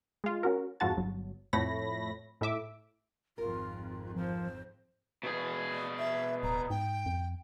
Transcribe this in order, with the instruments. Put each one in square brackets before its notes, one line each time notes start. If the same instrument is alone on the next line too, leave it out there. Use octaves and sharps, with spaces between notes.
[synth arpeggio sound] G#3 F4
C#4 F#4 A#4
F2 G#2 F4 F#4 A5 A6
G1 F#3
F2 A2 A3 C#5 B5 A#6
A2 E4 E5 D6
[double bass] G#1 F2 [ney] F4 [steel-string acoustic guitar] A#4
[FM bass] F3 [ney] C5
[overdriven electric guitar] B2 G#4
[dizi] E5
[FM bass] D1 [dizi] A#5
[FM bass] G#2 [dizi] G5
[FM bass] F2